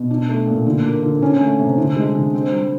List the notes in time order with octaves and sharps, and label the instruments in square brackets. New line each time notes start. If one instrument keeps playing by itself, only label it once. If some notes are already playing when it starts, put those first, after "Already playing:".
Already playing: [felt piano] B2
D4
A3
A#2
D3
A#3
D3
C#4
A3
C3
D3
G#3
D3
C4
G3